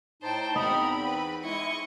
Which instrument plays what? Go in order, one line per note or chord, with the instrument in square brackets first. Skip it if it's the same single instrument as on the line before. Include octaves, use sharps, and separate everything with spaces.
[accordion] A2 D#4 A5 [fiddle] C5 G5
[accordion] E2 C4 B5 [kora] D#4 [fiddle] F#4 A#4
[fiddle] B4
[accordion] G#3 E4 [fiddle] D#5 C#6